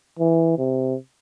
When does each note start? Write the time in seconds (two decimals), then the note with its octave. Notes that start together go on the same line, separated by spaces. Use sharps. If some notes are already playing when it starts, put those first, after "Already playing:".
0.19 E3
0.59 C3